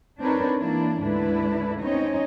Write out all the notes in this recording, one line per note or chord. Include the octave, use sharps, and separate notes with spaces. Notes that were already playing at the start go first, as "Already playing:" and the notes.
C4 D4 D#4 A#4 B4 C#5
E3 A#3 D4 E4
D2 G#2 D3 D4 E4 B4
C4 C#4 D#4 C#5 D#5